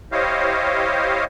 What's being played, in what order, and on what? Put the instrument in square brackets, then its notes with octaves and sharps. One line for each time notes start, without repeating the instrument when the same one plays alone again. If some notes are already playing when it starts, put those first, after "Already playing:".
[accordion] E4 G4 C5 C#5 D#5 F5